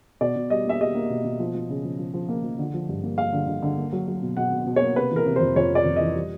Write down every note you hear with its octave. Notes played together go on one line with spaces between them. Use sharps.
B2 D5
B2
G3 D#5
A#3 E5
G3 D#5
A#3
B2
B2
F3
F3
C#3
F3
F3
F3
A#3
F3
D3
F3
G2
A#3
A#3 F5
D3
D3
D3
A#3
F#3
F#3
B2
B2 F#5
B2
B2
C#5
A#3
C3 B4
E3 A#4
C3
C5
F2
F2 C#5
C3 D5
F2
E3 D#5
G3